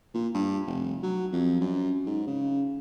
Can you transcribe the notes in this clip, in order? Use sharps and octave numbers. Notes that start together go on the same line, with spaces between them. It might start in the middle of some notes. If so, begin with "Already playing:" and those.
A#2
G2
F1
F#3
F2
F#2
G#2
C#3